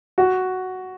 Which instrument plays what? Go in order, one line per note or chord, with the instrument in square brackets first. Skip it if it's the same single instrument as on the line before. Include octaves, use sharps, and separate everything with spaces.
[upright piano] F#4